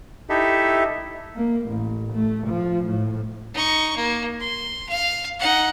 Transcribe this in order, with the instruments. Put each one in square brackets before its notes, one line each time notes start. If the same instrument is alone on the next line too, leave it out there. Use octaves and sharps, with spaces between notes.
[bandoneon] D#4 E4 G4 A4 E5
[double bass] A#3
A1
A3
F3
A2
[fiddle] D#4 C#6
A#3
C6
F5
D#4 F#5